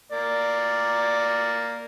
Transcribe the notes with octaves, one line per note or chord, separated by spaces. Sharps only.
A#3 D5